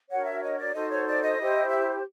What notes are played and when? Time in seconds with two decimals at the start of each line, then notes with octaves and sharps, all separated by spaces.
0.10 D4 F#4 A#4 C#5 F#5
0.25 E5
0.42 D#5
0.58 D5
0.73 D#4 F#4 A4 C5 D#5
0.90 C#5
1.06 D5
1.21 D#5
1.37 E4 G4 C5
1.69 E5